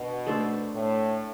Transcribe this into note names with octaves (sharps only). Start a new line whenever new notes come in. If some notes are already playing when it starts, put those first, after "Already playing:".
Already playing: B2 B3 D4
A3 D4 A4 C5
A2